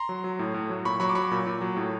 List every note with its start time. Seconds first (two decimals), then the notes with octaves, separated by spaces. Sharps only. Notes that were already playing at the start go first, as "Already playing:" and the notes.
Already playing: A#5 C6
0.09 F#3
0.24 F#3
0.39 A2
0.54 A2
0.69 F#3
0.85 A#2 B5 C#6
1.00 F#3 B5 C#6
1.09 D6
1.15 F#3 B5 C#6
1.31 A#2
1.47 A#2
1.61 F#3
1.77 A2